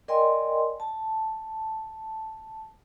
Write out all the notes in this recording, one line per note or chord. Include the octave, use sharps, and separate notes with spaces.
A#4 D5 D#5 G5 G#5 C6
A5